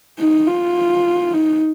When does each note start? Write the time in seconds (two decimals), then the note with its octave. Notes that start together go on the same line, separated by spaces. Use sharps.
0.19 D#4
0.47 F4
1.33 D#4